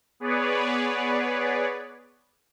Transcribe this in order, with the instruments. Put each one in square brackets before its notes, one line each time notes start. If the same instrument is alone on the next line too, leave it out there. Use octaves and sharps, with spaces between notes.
[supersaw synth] B3 G#4 B4 C#5 D5